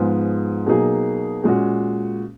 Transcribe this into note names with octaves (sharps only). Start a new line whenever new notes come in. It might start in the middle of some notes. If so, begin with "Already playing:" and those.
Already playing: G#2 F3 G#3 B3
B2 F#3 A#3 D#4 G#4
A#2 G#3 C#4 F#4